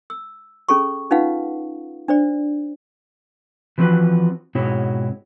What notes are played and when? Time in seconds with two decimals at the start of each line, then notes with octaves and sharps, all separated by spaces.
0.10 E6
0.69 C#4 G#4 A4 B5 C#6
1.11 C#4 D#4 F4 B4 F5 F#5
2.08 D4 C5 D5
3.78 E3 F3 C4 F#4 B4
4.55 G#2 B2 C4 E4 F#4 C#5